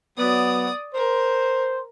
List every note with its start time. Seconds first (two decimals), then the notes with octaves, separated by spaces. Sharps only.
0.17 F#3 B3 D5 D#6
0.94 A#4 C5